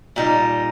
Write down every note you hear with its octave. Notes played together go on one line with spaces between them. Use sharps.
A#2 G3 D#4